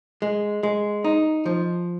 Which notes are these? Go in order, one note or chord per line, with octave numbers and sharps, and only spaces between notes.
G#3
G#3
D#4
F3